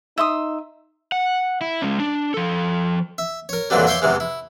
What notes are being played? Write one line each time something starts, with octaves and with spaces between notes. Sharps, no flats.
D#4 E5 C6 D#6
F#5
E4
G#3 C#4
D4
F3 A4
E5
A#4 C#5
F2 A#2 D3 E3 F#3 G3
C#5 E5 F5 G5 C6 D6
E2 C3 E3 G#3
E4